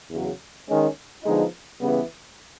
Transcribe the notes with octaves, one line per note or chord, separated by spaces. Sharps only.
E2 C#3 F#3
D#3 G#3 C#4
D3 F3 G#3 B3 D#4
C#3 E3 G3 B3